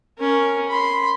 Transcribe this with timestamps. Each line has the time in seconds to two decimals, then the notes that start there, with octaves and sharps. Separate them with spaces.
0.19 C#4 A#4
0.69 B5 C6